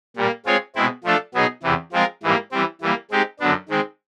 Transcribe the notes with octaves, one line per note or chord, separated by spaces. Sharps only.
A#2 G3 A#3
G#3 C4 F4 G#4 C#5
B2 G#3 C4 E4
F3 A3 D4 F4 A4
B2 F#3 B3 D#4 G#4
E2 C3 E3
F3 G#3 C4 F4 A#4
G#2 E3 G3 A#3
E3 G3 C4
E3 G3 A#3
G#3 C4 D#4 G4
F#2 D3 F#3 B3 D4
D#3 G#3 C4